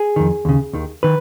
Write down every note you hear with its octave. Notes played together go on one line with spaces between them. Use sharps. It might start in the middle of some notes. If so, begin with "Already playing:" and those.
Already playing: G#4
F2 D#3
D#2 C#3
D#2 D#3
D#3 B4